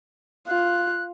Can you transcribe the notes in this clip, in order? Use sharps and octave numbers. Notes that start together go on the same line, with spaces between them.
F4 F#6